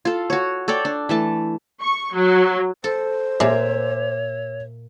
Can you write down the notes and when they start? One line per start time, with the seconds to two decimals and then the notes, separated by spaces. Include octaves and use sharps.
0.05 F4 A4
0.30 F#4 C#5
0.68 A4 C#5 D5 G5
0.85 D4
1.09 E3 A3 A5
1.80 C#6
2.14 F#3
2.84 A4 C5
3.40 A#2 C#5 E5 G#5 D6